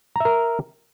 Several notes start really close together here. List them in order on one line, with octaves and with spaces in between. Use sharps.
A#5 E5 A#4